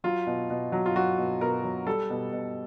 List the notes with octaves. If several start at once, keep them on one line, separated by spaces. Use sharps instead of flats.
F#3 F4
B2
B2
F#3
F4
F#3 F#4
B2
B2 A#4
F#3
G3 A4
B2
B2